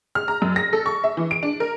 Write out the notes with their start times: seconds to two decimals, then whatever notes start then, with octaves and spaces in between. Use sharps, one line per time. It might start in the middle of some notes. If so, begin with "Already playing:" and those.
0.15 F6
0.28 A#5
0.42 F#2
0.56 A#6
0.73 A4
0.86 C#6
1.04 E5
1.17 E3
1.31 D7
1.43 D4
1.60 A#4